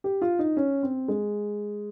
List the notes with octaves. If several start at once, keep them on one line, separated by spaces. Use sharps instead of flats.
G4
F4
D#4
C#4
C4
G#3